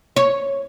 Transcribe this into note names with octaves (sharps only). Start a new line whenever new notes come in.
C#5